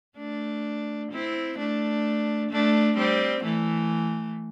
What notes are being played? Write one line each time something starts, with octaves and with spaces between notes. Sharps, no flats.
A3 D4
C4 E4
A3 D4
A3 D4
G3 C4
E3 A3